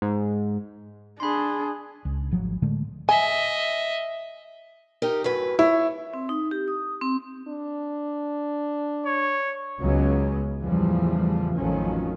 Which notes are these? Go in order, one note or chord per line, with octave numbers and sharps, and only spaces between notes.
G#2
D4 G#4 B5 C6
C#2
G#1 F3 F#3
A2 D3 G#3 A3
D#5 E5 G#5
D#4 G4 A#4
F#2 A2 B4
E4 C#5
C4
D#4
G4
D#6
C4
D4
C#5
C#2 F#3 B3 C#4
E2 A2 C#3 E3 F3 G3
A1 F2 D#3 F3 F#3 C#4